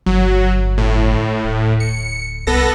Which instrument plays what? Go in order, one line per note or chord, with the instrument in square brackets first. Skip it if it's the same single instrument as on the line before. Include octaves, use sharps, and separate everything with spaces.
[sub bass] G1 [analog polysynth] F#3
[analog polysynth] A2
[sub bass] D1
[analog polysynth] C#7
[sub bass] C2 [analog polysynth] B3 A4 A#6